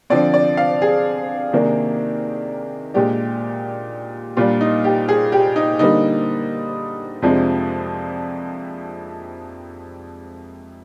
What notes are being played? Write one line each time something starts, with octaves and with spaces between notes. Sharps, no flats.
D3 F3 C4 D5
D5
F5
G#4
C3 D#3 A#3 D4
A#2 G#3 D4 G4
A#2 G3 D4 F4
D#4
G4
G#4
G4
D#4
D3 G3 A#3 D#4
F2 C3 F3 G#3 D4